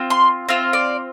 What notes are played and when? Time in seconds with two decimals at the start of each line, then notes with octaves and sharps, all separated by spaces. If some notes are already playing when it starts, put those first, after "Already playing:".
Already playing: C4 F4
0.10 C6
0.49 C4 F4 F5
0.73 D5